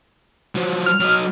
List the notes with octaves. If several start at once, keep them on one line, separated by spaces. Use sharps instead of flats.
F3 F#3
F6
F#3 D#5